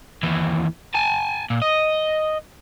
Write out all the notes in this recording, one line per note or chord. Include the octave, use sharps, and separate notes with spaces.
D#2 E3
G#5 A5
A#2
D#5